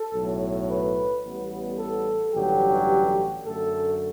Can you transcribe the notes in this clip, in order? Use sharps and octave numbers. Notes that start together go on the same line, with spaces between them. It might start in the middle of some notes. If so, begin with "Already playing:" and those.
Already playing: A4
B1 A2 F#3
B4
A1 A2 G3 B3
A4
A1 G2 D3 F#3 G4
F#2 D3 A3 A4